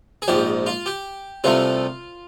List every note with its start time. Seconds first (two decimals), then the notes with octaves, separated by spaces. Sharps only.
0.22 G#4
0.28 A#1 G#2 F3 G4
0.66 F4
0.86 G4
1.44 C2 C3 F3 A3 F4